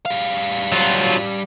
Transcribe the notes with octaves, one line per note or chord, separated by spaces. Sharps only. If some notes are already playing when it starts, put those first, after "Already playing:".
G3 F5
F#3 F4